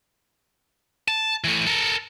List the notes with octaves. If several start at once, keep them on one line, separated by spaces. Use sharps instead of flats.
A5
E3 A3
A4 A#4